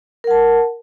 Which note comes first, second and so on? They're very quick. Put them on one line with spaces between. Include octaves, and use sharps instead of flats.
A#4 F#5 A5